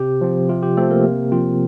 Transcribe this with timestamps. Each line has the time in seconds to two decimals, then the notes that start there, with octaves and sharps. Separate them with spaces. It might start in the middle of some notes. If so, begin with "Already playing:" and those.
Already playing: C3 G4
0.21 F3 C4
0.49 C3 F4
0.62 G4
0.77 F3 A3 C4 A4
0.90 A#3 A#4
1.04 C3
1.32 F3 C4 F4